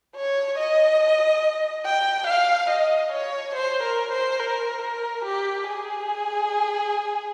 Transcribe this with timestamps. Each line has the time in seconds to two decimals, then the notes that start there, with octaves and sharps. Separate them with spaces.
0.16 C#5
0.58 D#5
1.86 G5
2.28 F5
2.70 D#5
3.12 C#5
3.55 C5
3.83 A#4
4.12 C5
4.39 A#4
4.82 A#4
5.25 G4
5.67 G#4